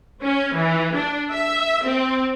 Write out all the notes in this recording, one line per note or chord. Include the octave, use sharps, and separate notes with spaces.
C#4
E3
D4
E5
C4